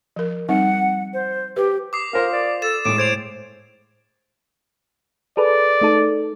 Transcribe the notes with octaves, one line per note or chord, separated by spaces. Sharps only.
F3 A#4
G3 C4 D#4 F#5
C5
G4 B4
D6 D#6 C7
F4 A#4 C5
D5
A4 A6 E7
A2 G#3 D6 E7
C5 G#6 D7 F7
G#4 A4 B4 D5
A3 D#4 A4